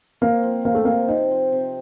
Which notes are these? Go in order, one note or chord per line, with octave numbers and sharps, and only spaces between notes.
A#3 C4
F3
C3 A#3
A3
C3 A#3
C3 D#4
F3
C3